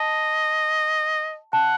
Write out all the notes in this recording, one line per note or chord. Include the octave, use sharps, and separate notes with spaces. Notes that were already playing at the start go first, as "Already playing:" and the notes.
Already playing: D#5 A5
F#5 A5